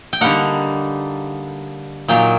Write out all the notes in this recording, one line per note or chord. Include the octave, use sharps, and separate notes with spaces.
G5
D3 G3 A#3 D#4 F#5
A#2 F#3 A#3 D#4 G5